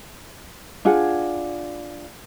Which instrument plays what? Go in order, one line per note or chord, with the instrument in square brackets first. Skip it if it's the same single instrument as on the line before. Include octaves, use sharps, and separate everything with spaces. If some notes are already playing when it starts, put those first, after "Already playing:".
[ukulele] D4 F4 G#4 F#5